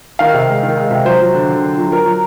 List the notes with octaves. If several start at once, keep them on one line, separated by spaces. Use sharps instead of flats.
D#3 F5
C3
G#3
D#3
G#3
C3
F#3 C5
F#3
D3
D3
D3
F#3
F#3 A#4
F#3